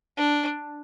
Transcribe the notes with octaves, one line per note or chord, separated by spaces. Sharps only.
D4